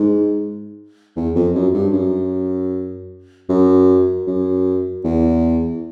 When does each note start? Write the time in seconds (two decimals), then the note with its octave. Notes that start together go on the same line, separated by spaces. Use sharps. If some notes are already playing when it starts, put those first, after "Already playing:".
Already playing: G#2
1.17 E2
1.35 F2
1.55 F#2
1.74 G2
1.93 F#2
3.49 F#2
4.27 F#2
5.04 E2